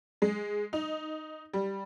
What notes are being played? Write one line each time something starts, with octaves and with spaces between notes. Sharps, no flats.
G#3
D#4
G3